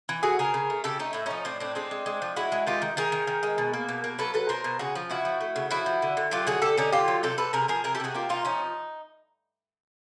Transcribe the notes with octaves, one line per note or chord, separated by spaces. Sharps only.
E3
A3 F#4 G#4
C#3 G#4 A#4
C#3
A3
C#3 G4 A4
A3 D#4
A2 E4
F3 C#4 D#4
A2 C4 D4
A2 C4 D4
G#3 C4 D4
G#3
G#3
F3
G#3 E4 F#4
G#3
D#3 F4 G4
D#3
D#3 G#4 A#4
D#3
D#3
G#3
B2
A#3
B2
A#3
F#3 A4 B4
F#3 A4 B4
B2 A#4 C5
B2
C#3 F#4 G#4
F3
C#3 E4 F#4
F3
A3
C#3
F3 E4 F#4
F3
D3
D3
F#3 F4 G4
D3 F#4 G#4
D3 G4 A4
D3 C#4 D#4
D3 F4 G4
F#3
C3 G4 A4
C3 A4 B4
C3 G#4 A#4
F3 G#4 A#4
C3 G#4 A#4
G4 A4
C3 F#4 G#4
A#3 F4 G4
C3 D#4 F4
F3 C#4 D#4